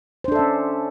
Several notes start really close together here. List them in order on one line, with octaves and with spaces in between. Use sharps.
C5 D4 A4 E5 C#4